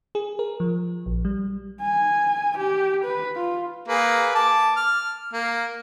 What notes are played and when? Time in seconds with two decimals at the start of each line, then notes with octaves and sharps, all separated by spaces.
0.15 G#4
0.39 A#4
0.60 F3
1.06 A#1
1.25 G3
1.82 G#5
2.57 G4
3.04 B4
3.36 F4
3.88 A#3 G#4 B4
4.35 A5 D6
4.76 F6
5.33 A#3